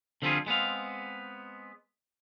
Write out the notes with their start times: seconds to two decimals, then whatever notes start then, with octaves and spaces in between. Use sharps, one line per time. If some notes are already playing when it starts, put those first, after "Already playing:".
0.22 D3 F3 G3 C4 F4 G#4
0.46 G#3 B3 C4 F5